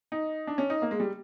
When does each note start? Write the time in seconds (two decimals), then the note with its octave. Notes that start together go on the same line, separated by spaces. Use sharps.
0.12 D#4
0.47 D4
0.58 C#4
0.70 D#4
0.82 A#3
0.91 G#3
1.00 G3